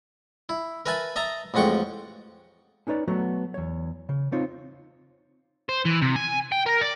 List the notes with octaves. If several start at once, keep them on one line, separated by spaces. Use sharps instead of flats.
E4
A#4 B4 E5 G#5 A5 B5
D#5 E5 A5 A#5
A1 F2 G#3 F#5 G5 C#6
C#4 D#4 B4 C#5 D5
F#3 A3 B3 F#4 A#5
E2 C#5
C#3
C4 D#4 F4 C#5
C5
E3
C3
G#5
G5
A#4
D5